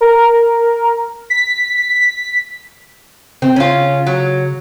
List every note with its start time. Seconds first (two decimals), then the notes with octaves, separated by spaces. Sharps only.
0.01 A#4
1.30 B6
3.42 C#3 C4
3.56 C#4 F4
4.07 F#3